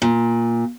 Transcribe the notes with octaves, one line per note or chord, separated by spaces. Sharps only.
A#2